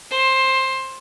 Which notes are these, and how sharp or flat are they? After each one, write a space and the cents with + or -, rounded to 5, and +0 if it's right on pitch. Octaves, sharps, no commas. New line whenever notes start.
C5 +15